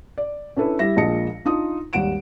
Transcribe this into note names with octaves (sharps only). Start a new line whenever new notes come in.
D5
C#4 D4 E4 A4 B4
G3 E4 E5 A#6
A#1 A#2 G#3 D#5 A5 C#7
D4 D#4 F4 D#6
G#1 D#2 G3 F#5 D7 E7